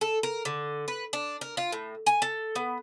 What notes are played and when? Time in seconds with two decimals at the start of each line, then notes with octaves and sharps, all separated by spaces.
0.01 A4
0.23 A#4
0.45 D3
0.88 B4
1.13 D4
1.41 A#4
1.57 F4
1.72 A2
2.06 G#5
2.22 A4
2.55 B3